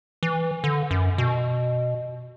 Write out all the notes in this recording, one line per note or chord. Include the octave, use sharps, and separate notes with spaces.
E3
D3
F#2
B2